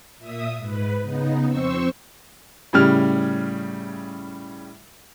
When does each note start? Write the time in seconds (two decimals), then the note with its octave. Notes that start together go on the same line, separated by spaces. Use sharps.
0.18 A#2 E5 D#6
0.58 G#2 B4
1.02 C#3 B3 D#4
1.48 F2 C4 C5 C#6 E6
2.73 A2 C#3 G3 F6